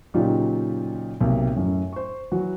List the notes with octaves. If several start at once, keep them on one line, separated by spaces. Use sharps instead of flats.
A#2 C#3 F#3 D#4 F4 G4
B1 C3 A#3
F#2 A2 F#3
C5 C#6
E3 F#3 F#4